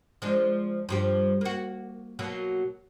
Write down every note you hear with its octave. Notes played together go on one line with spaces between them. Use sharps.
F3 G#3 D4
G2 F3 G4
A#3 F#4
B2 F#3 A#3